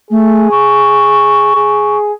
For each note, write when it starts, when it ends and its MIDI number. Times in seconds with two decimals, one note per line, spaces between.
0.11 0.51 57
0.11 1.54 68
0.51 1.97 85
1.56 2.13 68